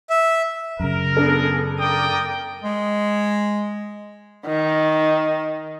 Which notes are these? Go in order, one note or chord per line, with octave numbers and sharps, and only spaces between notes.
E5
F#2 C#3 A#4
B3 D4 G#4 A4
A#4 D5 G5 D#6
G#3
D#3